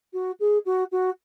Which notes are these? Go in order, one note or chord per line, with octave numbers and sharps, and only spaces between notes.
F#4
G#4
F#4
F#4